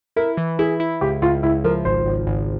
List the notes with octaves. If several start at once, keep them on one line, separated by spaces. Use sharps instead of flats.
E4 A#4
E3
E4 G#4
E4
C#2 G4
C#2 F4
C#2 E4
F3 A#4
G#1 C5
G#1
G#1